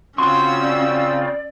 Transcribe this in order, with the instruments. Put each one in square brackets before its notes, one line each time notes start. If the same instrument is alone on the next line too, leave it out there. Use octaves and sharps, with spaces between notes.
[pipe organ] C#3 C4 F4 [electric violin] C#4 E6 [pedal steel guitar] F#4 C6 C#6
[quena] D5